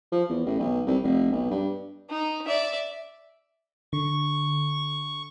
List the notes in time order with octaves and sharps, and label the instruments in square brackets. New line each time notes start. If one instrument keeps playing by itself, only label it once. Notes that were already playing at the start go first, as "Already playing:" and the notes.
[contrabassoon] F3
E2
A1
B1
C2
F1
B1
G2
[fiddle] D#4
D5 E5
[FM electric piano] D3 [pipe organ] C#6